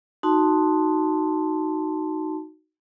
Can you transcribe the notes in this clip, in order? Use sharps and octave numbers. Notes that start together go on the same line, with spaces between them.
D#4 F#4 A5 C6